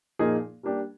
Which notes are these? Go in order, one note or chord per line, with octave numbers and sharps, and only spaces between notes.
A#2 F3 A#3 D#4 G#4
G3 A#3 D4 G4